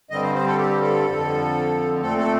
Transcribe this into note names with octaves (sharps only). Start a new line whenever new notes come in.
G2 D3 G3 C4 D#5
C5
C5
A4
G4
A4
F2 D3 F3
A#2 A3 C4 A4
A4